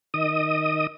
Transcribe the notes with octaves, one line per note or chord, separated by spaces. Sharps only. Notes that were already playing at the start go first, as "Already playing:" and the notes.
D#3 D#5 D#6